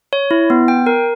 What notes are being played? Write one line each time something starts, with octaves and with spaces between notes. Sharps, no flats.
C#5
E4
B3
G5
A#4